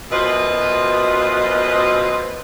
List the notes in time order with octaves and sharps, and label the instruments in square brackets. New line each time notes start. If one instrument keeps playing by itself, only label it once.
[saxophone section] F#2 B2 F4 B4 C5 D#5